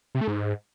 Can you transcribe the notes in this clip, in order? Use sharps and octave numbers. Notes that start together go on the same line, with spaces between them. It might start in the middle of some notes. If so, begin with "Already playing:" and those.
C3
A3
G#2